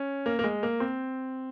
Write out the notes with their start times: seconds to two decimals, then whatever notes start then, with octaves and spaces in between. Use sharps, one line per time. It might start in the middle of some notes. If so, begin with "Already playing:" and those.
Already playing: C#4
0.26 A#3
0.39 A#3
0.44 G#3
0.63 A#3
0.80 C4